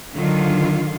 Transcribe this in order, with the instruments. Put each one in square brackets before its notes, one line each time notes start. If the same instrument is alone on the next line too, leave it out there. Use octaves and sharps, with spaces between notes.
[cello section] D3 D#3 F#3 F4